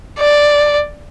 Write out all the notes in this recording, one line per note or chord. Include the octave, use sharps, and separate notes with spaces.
D5